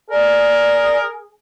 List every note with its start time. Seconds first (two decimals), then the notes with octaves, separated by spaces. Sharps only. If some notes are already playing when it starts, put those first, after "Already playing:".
0.10 G#4 A#4 D5